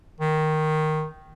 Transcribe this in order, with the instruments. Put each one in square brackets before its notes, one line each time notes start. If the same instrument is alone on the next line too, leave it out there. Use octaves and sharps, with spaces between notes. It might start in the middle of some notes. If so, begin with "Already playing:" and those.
[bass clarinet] D#3